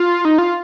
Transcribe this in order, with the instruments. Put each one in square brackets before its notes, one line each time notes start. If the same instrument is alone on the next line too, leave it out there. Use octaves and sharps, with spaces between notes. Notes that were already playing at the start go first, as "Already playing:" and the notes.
Already playing: [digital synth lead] F4
D#4
F4